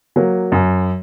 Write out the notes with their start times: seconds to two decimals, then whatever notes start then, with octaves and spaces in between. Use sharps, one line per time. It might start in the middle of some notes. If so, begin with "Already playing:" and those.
0.16 F#3 A#3
0.52 F#2